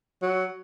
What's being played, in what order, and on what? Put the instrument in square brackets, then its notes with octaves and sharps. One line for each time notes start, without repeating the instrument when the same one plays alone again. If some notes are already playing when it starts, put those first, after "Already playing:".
[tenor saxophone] F#3